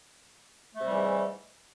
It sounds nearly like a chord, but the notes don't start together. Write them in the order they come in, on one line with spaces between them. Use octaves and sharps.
A3 C3 G3 E3 G#2